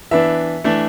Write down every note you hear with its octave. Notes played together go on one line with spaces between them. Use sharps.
E3 B3 D4 E5
E3 A3 D4